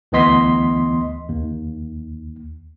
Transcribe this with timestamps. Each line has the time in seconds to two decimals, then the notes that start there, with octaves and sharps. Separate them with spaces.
0.12 D2 E3 B3 D#5 C6 B6
1.29 D#2